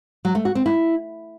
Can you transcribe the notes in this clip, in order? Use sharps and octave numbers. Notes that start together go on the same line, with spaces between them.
F#3
A3
F#4
C4
E4